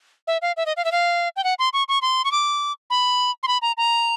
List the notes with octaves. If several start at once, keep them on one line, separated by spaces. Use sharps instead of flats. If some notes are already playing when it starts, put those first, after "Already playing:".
E5
F5
E5
D#5
F5
E5
F5
G5
F#5
C6
C#6
C#6
C6
C#6
D6
B5
C6
B5
A#5
A#5